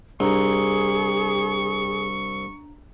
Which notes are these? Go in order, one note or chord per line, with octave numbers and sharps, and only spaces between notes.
C2 D4 G#4 A#5 C#6